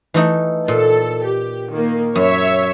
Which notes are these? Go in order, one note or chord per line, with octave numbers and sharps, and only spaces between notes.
E3 A3 D#4
A#2 A4
G4
D#3 A#3
F#2 C#5 E5